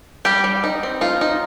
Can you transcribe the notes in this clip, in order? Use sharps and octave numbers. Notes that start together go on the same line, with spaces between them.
G3 G4
G3
D#4
C4
D#4 F4
D#4